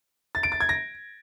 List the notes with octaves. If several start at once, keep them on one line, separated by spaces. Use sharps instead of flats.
A6
D7
A6
G#6
A#6